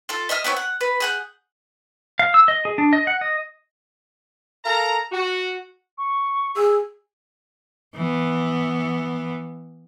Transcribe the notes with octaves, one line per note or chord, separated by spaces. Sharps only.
F4 A4
D#5 E5 D#6 F6
B3 C4 A4 C#5
F#5
B4
G#4 F#5 G6
F5
E6
D#5
G#4
D4
D#5
F#5
D#5
A4 A#4 F5 A#5
F#4
C#6
G#4 E6
E3 B3